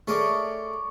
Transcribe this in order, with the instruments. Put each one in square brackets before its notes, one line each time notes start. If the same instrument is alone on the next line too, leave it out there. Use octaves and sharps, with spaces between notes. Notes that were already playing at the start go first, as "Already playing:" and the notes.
[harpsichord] A3 G#4 A#4 [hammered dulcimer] C#5 D5